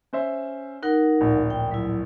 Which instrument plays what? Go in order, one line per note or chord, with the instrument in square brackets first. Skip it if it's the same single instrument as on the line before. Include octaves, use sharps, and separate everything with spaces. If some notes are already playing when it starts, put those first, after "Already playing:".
[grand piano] C#4 C5 E5
[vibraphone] D#4 A#4 F#5 [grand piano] F#6
[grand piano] D1 A#1 A#2
[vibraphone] G5
F#3 E4